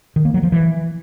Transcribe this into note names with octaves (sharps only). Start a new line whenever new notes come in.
D#3
A#3
F#3
F3
E3